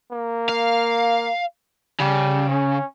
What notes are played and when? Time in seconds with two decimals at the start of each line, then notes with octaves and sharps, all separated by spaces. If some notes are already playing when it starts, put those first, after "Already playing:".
0.12 A#3
0.49 F5
2.00 C#3 G3
2.49 C#4